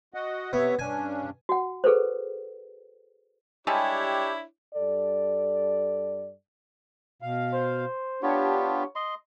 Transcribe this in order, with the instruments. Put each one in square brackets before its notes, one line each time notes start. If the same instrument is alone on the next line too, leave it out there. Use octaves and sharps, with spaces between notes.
[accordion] F#4 D#5 F#5
[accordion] C3 C#5 E5 [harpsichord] B3
[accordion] G2 C#4 D4 [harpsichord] G#5
[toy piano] F#4 F#5
G#4 A4 B4 C5
[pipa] G3 G#3 A4 [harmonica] D4 E4 C#5 [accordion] G4
[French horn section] G2 A4 D5
[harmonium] B2 F5
[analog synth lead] C5
[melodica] B3 F4 [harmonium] D4 G4 [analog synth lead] C#5
[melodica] D#5 C6